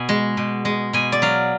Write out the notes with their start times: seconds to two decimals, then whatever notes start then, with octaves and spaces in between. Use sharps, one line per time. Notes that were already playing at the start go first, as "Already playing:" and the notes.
Already playing: B2 G#5
0.09 G#3
0.37 B2
0.65 G#3
0.93 B2 G#5
1.12 D5
1.22 F#3 F5